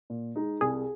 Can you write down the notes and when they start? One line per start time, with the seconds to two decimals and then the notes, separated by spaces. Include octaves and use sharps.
0.10 A#2
0.36 G#3 D#4
0.61 C2 G#4